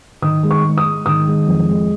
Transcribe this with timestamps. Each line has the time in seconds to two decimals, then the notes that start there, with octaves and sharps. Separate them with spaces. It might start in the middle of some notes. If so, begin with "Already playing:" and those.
0.22 D#3 D#6
0.43 G#3
0.51 C#6
0.64 G#3
0.78 D#6
0.85 G#3
1.06 D#3 D#6
1.27 G#3
1.47 F2
1.69 G#3